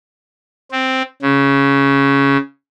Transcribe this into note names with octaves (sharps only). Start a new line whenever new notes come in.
C4
C#3